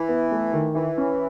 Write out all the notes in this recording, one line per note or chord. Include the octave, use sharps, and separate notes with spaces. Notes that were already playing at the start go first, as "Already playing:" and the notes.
Already playing: E3 E4
B3
A3
D#3
E3 E4
C#4